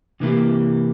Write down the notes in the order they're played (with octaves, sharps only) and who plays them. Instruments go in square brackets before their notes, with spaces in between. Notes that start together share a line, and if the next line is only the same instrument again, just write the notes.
[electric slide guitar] C3 E3 A#3 E4 G4